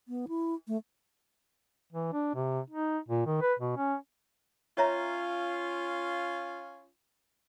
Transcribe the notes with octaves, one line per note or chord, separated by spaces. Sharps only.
B3
E4
A3
E3
D4
C3
D#4
A#2
D#3
B4
B2
C#4
C#4 F4 C#5 E5 A#5